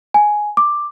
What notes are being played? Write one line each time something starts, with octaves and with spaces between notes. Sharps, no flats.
G#5
D6